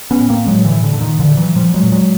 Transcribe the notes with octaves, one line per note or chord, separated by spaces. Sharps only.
B3 C#4
A2
A#3 C4
A2 F#3 G#3
D3 E3
A2
D3
D3
A#2 D#3
D3 E3
A#2
E3 F#3
A#2 F3 G3
F#3 G#3
A#2
F#3 G#3